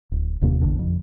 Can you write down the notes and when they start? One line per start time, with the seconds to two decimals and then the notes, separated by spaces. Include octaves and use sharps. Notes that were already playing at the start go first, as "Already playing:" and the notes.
0.12 D1
0.41 E1 D#2 C3 A#3
0.61 A1 E2 D3
0.79 F2